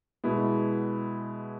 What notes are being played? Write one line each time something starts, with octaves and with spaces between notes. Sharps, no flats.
B2 G#3 B3 E4